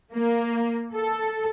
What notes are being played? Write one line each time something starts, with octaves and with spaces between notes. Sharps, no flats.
A#3
A4